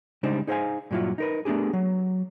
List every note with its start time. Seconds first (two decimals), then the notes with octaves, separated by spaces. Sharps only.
0.23 C#3 G3 G#3 D4 D#4 C5
0.47 D#4 G#4 C5 D#5 F5 G#5
0.91 G2 A#2 F#3 E4 F4
1.18 D#4 A#4 B4
1.45 A3 B3 D4 G4 G#4
1.73 F#3